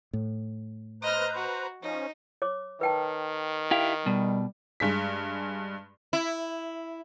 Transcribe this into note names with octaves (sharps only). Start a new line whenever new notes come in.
A2
B4 C5 D#5 A#5 F6
F#4
F3 C#4 D#4
C#5 D6
D#3 B4 G5 A5
E4 G4 F5
B2 G3
G2 G#3 B6
E4